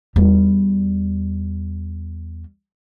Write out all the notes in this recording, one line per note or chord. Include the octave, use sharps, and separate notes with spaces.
E2 G3